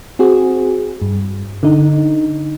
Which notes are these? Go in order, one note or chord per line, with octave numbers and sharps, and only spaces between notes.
C4 F#4 G#4
G2
D3 D#4